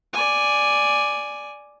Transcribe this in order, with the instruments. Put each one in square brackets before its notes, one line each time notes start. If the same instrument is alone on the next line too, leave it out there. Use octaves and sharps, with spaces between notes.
[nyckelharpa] D5 G#5